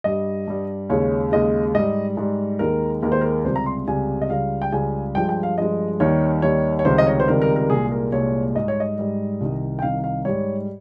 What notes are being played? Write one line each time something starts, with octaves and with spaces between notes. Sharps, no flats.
G2 G3 D#5
G2 G3
D#2 C#3 G#3 C#5
D#2 C#3 G#3 D#5
G#2 G3 D#5
G#2 G3
D#2 D#3 G#3 A#4
D#2 D#3 G#3 A#4
C5
A#4
C#2 C3 G3 C5
A#5
C6
C#2 C3 G3 G#5
D#5
C#2 C#3 G3 F5
G5
C#2 C#3 G3 G#5
G2 F3 G#3 G5
G5
F5
G2 F3 G#3 D#5
D#2 D#3 G3 C#5
D#2 D#3 G3 C#5
C#5
C#2 C3 D#3 G3 C5
D#5
C#5
C5
C#2 C3 D#3 G3 A#4
A#4
A#4
C2 A#2 G#3 G#4
A#4
C2 A#2 G#3 C#5
G#2 G3 D#5
C#5
D#5
G#2 G3
C2 C3 D#3
G5
C2 C3 D#3 F5
F5
G#2 G3 C#5